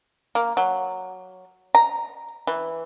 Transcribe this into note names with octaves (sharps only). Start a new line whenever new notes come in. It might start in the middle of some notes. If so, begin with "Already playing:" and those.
A#3
F#3
A#5
E3